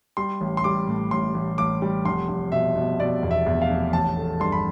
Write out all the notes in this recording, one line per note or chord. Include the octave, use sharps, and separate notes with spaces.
G3 C6
A1
C6
G3 D6
A2
A1 C6
A1
A1 D6
G3
F1 C6
F1
B2 E5
B2
B2 D5
E2
E5
E2
F5
F1
A1 A5
A3
G2 C6
B5